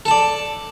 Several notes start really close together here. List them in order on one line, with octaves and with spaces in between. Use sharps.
A4 A5 D5